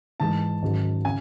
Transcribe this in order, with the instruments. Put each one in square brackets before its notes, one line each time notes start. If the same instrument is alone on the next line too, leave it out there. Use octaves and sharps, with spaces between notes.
[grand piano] G#2 E3 G#3 [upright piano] A5
[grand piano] G#2 D#3 F#3 C#4 G#4
[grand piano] C#3 [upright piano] G#5